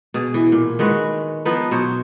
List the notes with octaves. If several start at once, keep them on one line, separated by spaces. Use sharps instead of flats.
B2 G#4
E3
A#2
D#3 G#3 F#4 B4
F3 B3 D#4 B4
B2 F#3 C5 C#5